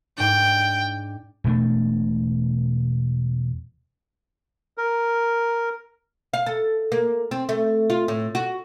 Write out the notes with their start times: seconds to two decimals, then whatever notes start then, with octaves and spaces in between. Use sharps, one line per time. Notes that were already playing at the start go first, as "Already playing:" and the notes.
0.18 G#2 D4 G5
1.44 E1 B2 A3 D4
4.78 A#4
6.33 F5
6.46 A4
6.92 A#3
7.31 C4
7.49 A3
7.90 F4
8.08 A2
8.35 F#4